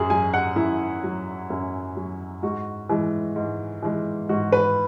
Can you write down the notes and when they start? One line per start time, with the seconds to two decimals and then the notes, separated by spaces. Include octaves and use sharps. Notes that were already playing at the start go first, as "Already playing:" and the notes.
Already playing: F#2 F#4 G#4
0.10 F#3 G#5
0.34 F#5
0.56 F#2 E4
1.04 F#3
1.50 F#2
1.96 F#3
2.43 G#2 F#4
2.89 E3 G#3
3.36 G#2
3.83 E3 G#3
4.29 G#2 F#4
4.52 B4